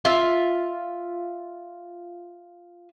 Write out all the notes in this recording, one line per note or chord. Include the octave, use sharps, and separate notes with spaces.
F4 E5